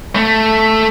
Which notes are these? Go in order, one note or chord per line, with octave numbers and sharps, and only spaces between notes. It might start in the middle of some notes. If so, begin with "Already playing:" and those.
A3